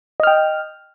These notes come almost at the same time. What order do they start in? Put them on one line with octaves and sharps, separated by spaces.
D#5 F6 G5